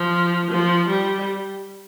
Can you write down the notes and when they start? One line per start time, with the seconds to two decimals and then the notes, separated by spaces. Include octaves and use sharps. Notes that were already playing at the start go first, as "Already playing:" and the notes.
Already playing: F3
0.50 F3
0.88 G3